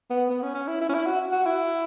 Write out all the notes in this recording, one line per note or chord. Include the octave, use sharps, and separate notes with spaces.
B3
B3
C#4
C#4
E4
E4
C#4
E4
F#4
F#4
E4